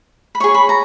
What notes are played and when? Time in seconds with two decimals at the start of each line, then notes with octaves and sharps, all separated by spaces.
0.35 B5
0.40 G#4 C#5 C#6
0.54 B5
0.69 A#5